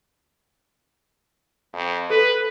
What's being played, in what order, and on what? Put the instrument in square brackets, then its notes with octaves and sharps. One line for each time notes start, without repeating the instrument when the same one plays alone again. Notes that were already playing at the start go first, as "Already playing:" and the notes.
[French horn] F2
[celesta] A4 [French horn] B4